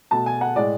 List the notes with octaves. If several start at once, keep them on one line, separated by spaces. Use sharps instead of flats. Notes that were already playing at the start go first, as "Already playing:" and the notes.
B2 A3 A5
G#5
F#5
A2 G#3 D5